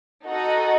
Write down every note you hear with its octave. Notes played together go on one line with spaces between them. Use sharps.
D#4 F#4 A4 D#5